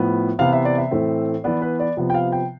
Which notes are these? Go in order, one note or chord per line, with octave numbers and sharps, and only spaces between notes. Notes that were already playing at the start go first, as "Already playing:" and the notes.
Already playing: A2 F3 B3
C3 E3 B3 F5
E5
D5
E5
A2 E3 A3 C4
E3 B3 D5
B4
D5
C3 F3 B3
G5
F5
G5